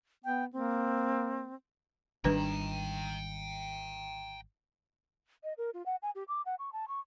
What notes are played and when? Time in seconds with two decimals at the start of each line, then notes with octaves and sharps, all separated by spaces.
0.25 B3 G5
0.53 A#3 C4
2.25 G#1 D#3 G3 D4 B4 G5 A#5
5.44 D#5
5.58 A#4
5.74 F4
5.86 F#5
6.02 G#5
6.15 G4
6.28 D6
6.46 F#5
6.59 C#6
6.73 A5
6.88 C#6